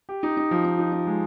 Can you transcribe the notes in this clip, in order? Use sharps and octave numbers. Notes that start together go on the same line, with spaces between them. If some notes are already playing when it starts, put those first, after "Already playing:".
G4
D#4
D#4
F3
D#4
D#4
D#4
G#3